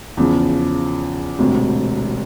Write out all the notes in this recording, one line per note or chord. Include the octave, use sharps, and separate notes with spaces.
E2 C#3 F3
E1 D2 C3